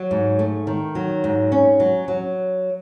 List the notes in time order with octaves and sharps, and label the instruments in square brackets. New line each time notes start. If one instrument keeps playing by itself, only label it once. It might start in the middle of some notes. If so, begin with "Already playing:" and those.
Already playing: [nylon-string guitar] F#3
G#2
A3
D#3
F#3
G#2
C#4
F#3
F#3